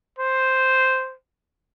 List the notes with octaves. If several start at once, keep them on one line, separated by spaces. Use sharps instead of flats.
C5